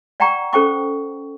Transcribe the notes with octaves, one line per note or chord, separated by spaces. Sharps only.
D5 F#5 G5 A#5 C#6
C#4 A4 C5 G5 C#6 D6